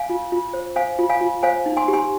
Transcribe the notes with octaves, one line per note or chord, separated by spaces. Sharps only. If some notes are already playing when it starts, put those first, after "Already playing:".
Already playing: F5 G#5
F4
F4
C5
C5 F5 G#5
F4
F5 G#5
F4
C5 F5 G#5
D#4
G#5 C6
G4
G#5 C6